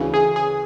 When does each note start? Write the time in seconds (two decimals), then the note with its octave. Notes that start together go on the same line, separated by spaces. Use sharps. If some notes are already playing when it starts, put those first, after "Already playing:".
Already playing: D2 C#3 E3
0.14 G#4
0.36 G#4